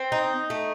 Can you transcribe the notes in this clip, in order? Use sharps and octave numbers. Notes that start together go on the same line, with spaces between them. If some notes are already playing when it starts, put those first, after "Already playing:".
Already playing: C4
D#4
A3